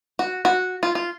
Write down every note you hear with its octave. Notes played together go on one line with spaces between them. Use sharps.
F#4
F#4
F4
F4